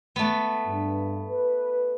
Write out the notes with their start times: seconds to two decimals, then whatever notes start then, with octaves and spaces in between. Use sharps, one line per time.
0.16 A3 B3
0.66 G2
1.30 B4